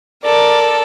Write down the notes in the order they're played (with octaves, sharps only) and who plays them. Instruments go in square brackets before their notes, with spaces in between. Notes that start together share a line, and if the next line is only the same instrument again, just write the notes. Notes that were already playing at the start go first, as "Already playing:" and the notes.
[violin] A4 [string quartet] A#4 D5